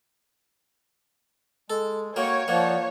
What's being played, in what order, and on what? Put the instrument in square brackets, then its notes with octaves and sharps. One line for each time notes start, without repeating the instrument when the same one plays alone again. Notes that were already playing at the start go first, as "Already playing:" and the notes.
[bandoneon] G#3 [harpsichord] A4
[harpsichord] A#3 [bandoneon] F#4 G5 [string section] C#5
[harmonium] F3 [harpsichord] A#3 [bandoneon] D5 F#5